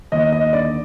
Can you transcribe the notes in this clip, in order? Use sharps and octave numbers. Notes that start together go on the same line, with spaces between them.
D#2 D#5
D#5
D3 D5